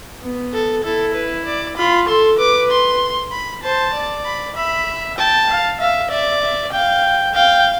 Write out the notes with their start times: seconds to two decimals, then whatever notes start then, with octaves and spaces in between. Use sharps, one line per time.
0.22 B3
0.53 A4
0.83 E4 A4
1.14 B4
1.46 D5
1.77 F4 B5
2.08 A4 C6
2.38 B4 D6
2.70 C6
3.32 B5
3.63 C5 A5
3.93 D5
4.25 B5
4.55 E5 B5
5.18 G5 A5
5.49 F5
5.80 E5 F5
6.10 D5 E5
6.42 E5
6.72 F5 G5
7.34 F5 G5